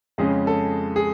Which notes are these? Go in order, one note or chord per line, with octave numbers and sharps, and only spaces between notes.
F2 C#3 G#3 C#4 G#4
A4
G#4